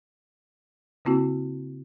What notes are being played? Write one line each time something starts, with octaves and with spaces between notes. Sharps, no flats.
C#3 A#3 C4 E4 F#4